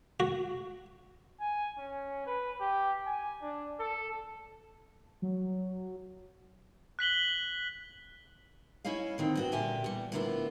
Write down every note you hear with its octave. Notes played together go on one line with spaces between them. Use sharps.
F#4
G#5
C#4
B4
G4
G#5
D4
A4
F#3
F#6 B6 F#7 G7
C#4 E4 C#5 D#5 F5
D3 D#3 C4
G2 F#4 G5
A#2 D3 G4 E5 G5 G#5
E2 G3
A2 D3 A#3 B3 E4 F4